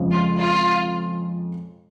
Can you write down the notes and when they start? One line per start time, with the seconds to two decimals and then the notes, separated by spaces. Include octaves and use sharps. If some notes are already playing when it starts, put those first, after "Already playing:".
Already playing: F2 C#3 F3 G#3
0.11 F4
0.39 F4